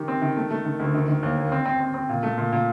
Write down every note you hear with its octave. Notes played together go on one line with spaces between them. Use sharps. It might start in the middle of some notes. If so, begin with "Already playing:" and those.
Already playing: D#3 G4
C4
D#3
A3
A3
D#3
D2
D#3
D#3
D#2
A#3
C4
C4
C4
C4
A#2
A3
A#2
A#2